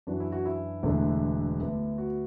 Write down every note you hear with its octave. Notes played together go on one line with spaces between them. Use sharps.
F#2 E3 D4 F#4
E4
F#4
E4
E1 E2 D3 A3 D4
D2 D3 B3
F#4